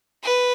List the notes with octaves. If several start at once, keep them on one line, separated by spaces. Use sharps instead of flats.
B4